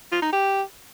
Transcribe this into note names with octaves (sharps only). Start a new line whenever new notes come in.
F4
D#4
G4